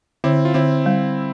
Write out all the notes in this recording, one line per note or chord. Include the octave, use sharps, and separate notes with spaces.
D3 C4 E4
F4
D3 C4 E4
G3